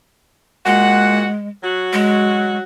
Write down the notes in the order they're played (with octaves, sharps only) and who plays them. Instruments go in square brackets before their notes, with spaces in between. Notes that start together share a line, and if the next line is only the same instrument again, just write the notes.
[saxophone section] A#2 F#4 F#5 [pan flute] G#3
[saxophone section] F#3 F#4
[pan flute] G#3